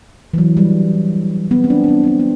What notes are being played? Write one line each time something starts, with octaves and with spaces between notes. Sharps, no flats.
E3
F#3
G3
B3
C4
D4
D4
C4
C4
D4
B3